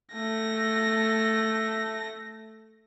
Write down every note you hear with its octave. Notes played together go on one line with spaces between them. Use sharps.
A3 A#6